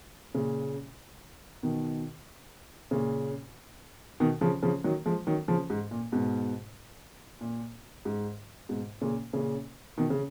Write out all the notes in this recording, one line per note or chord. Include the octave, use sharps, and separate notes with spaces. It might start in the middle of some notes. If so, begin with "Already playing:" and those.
A#2 C#3
B2 D#3
A#2 C#3
B2 D#3
C#3 F3
C#3 F3
D#3 F#3
F3 G#3
D#3 F#3
C#3 F3
G#2
A#2
G#2 B2
A#2
G#2
G#2 B2
A#2 C#3
A#2 C#3
B2 D#3
C#3